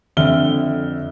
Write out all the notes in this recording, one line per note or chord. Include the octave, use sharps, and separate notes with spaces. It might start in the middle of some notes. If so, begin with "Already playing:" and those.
F2 D3 E5 F6 G7